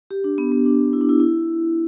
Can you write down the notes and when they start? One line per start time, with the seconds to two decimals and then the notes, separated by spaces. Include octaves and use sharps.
0.11 G4
0.24 D4
0.38 B3
0.52 B3
0.66 D4
0.93 E4
1.01 D4
1.09 E4
1.20 E4